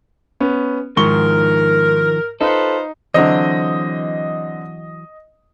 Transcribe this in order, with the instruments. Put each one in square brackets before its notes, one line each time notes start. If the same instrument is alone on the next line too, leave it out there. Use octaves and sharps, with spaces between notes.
[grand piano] B3 C#4
[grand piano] G#2 C#6 G7 [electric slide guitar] D#3 F3 [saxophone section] A#4
[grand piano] D#4 [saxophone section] F4 B4 C5 [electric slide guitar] A4
[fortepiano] D3 C4 [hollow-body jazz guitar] E3 F#3 [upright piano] D#5